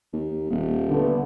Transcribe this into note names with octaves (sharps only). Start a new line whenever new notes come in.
D#2
D#1
D3 A3 B3